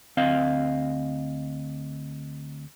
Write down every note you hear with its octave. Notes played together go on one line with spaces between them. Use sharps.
D2 C4 D#5 F5